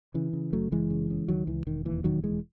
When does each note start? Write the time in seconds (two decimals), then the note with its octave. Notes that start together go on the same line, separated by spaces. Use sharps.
0.14 C#3 E3
0.33 C#3
0.52 F#1 F#3 A3
0.72 F#1 E3 G#3
0.90 C#3
1.10 C#3
1.28 C#2 D#3 F#3
1.47 C#2 E3
1.67 E1 D#3
1.85 D#2 E3
2.04 E1 D#3 F#3
2.23 E1 E3 G#3